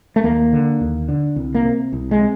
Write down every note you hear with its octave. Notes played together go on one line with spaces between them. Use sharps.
A3
D#2 A#3
D3
D#2
D3
C2
A#3
C3
C2
G#3
C3